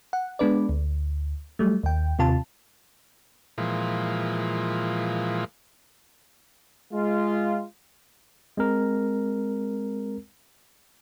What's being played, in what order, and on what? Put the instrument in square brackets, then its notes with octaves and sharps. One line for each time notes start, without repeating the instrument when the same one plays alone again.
[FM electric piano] F#5
G#3 B3 D4 B4 D5
D2
F#3 G3 A3
D#2 G5
D#2 C3 F4 A5
[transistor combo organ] A#2 E3 F3 G#3
[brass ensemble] G#3 F4
[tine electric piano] G#3 C4 A#4